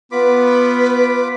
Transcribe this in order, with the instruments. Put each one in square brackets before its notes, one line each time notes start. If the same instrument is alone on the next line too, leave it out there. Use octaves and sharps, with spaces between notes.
[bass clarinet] B3 [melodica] F4 B5 D6 [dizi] B4